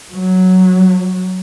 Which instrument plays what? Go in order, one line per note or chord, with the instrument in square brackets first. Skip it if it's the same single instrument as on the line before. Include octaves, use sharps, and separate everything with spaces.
[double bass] F#3